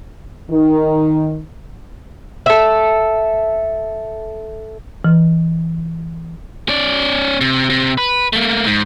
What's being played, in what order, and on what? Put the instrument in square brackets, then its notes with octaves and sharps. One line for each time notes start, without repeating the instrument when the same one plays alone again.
[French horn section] D#3
[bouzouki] A4 E5
[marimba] E3
[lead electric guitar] C#4 D5
C3
C3
B4
A3 A#3
G#2